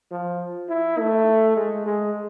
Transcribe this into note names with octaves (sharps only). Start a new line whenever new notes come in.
F3
E4
A3
G#3
G#3